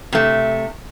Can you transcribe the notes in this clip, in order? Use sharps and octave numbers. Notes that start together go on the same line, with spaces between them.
C3 A3